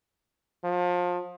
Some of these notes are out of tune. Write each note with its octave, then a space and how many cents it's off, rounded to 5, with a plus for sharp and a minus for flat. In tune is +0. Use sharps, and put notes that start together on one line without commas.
F3 +30